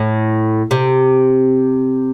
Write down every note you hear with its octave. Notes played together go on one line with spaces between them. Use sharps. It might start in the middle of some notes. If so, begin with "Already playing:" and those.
Already playing: A2
C3